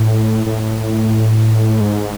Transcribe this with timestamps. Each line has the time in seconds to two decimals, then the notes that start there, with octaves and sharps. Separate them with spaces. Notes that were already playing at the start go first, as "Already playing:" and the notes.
Already playing: A2
0.46 A2
1.80 G#2